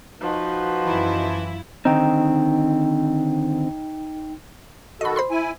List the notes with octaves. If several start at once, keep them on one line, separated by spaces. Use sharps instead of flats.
F3 D#4 F#4 B4
F#2 E3 E4
D3 D#3 C4 D#4 G5
D#3 F#4 A4 D#5 B5
C5 B5 C6
E4 G#5